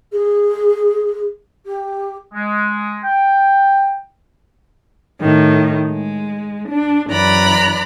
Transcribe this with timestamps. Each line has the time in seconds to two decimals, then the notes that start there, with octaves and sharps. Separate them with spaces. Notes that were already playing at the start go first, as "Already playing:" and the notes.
0.12 G#4
1.65 G4
2.33 G#3
3.04 G5
5.20 A2 D#3
5.89 G#3
6.69 D4
7.09 F#2 E3 D5 A#5 B5 F#6